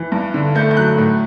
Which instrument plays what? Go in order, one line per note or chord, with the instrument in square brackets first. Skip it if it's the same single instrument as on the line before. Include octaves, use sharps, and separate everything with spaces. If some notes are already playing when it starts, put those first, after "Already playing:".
Already playing: [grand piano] E3
G2
D3
A3 G6
G6
F#3 F#6
A2